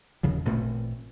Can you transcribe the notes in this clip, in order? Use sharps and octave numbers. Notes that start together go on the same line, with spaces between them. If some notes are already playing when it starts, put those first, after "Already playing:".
D#2 C#3 F3
A1 A#2 A3 C4